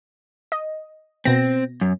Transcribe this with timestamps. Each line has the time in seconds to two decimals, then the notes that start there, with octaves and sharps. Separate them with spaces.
0.52 D#5
1.25 B2 C4 A#6
1.81 F#2